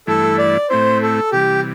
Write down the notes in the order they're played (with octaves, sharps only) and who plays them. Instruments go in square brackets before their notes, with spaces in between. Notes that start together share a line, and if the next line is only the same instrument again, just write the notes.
[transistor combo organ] G2 E3 A3 E4 [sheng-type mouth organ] A4
[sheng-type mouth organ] D5
[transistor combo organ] A2 A3 C4 E4 [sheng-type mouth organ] C5
[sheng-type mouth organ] A4
[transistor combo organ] C3 E3 G3 [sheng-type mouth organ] G4